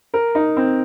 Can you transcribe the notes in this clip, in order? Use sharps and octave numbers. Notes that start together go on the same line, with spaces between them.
A#4
D#4
C4